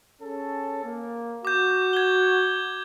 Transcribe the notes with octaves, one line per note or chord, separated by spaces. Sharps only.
C#4 G#4 A4
A#3
F#4 D6 G6
G#6 G7